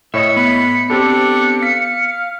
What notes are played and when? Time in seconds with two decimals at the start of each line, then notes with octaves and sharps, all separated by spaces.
0.14 A2 C#5 D#5 E5 C#7
0.36 B3 B5
0.90 C4 D4 G4 A4
1.63 F5 B6